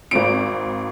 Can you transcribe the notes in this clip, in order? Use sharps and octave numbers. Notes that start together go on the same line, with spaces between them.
G#1 C4 D7